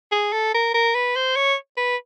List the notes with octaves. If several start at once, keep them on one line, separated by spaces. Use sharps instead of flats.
G#4
A4
A#4
A#4
B4
C5
C#5
B4